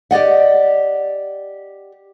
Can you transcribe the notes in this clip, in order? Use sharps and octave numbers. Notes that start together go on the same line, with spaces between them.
G4 D5 D#5 F#5